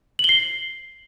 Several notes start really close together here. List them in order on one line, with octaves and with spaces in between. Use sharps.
F#7 G7 C7